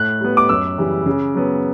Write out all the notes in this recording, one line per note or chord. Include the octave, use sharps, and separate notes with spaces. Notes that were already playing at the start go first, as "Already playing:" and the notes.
Already playing: A2 F#6
G3 B3
D6
F#2 E6
C#3 E3 G3
C#3
F#3 B3